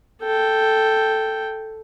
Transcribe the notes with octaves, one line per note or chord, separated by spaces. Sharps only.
A4 G5